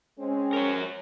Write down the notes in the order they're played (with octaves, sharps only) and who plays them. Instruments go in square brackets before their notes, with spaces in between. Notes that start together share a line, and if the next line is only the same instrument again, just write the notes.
[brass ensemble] G#3 C4 C#4
[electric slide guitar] A#4 C#5